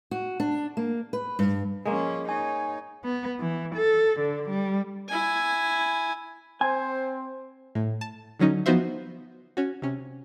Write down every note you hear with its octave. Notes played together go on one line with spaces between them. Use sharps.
F#4
D4
A#3
B4
G2
F3 G#3 A#3 C#4
D#4 C#5 G#5
B3
E3
A4
D3
G3
E4 G#5
C4 C5 G#5
A2
A5
D3 F#3 C#4 D#4
F3 B3 D#4 F#4 C5 E5
C#4 F#4
C3 C#4